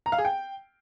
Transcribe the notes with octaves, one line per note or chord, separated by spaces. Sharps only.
A#5
F5
G#4
G5